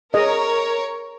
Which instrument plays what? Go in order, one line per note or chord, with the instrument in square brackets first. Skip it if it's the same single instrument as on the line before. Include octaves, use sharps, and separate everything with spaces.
[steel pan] G#4 D#5 [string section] A#4 C#5